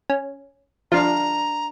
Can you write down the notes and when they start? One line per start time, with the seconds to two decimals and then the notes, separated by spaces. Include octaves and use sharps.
0.10 C#4
0.92 F3 D4 F5 A#5